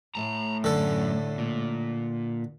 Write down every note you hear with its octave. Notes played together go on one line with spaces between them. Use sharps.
A2 A5 A#5
F#2 D3 A4
A#2